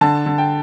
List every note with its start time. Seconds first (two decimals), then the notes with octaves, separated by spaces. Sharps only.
0.01 D3 A5
0.26 D3
0.38 G5